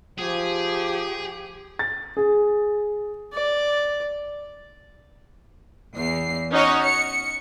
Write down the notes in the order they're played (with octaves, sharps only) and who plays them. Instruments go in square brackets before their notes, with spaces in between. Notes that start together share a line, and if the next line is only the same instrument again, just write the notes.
[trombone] F3 [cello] G4 [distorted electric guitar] G#4
[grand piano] A6
G#4
[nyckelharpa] D5
[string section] E2 C7
C#4 D#4 F#4 C#5 D#5
C#7